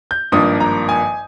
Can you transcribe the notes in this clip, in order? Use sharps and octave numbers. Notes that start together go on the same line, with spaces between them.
G6
G#1 G2 F3 A#3 D4 D#6
A#5
G#5